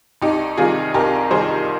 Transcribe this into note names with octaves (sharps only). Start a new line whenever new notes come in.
C2 D#4 G4
C3 D#3 G3 F4 G#4
C2 G4 A#4
C3 D#3 G3 G#4 C5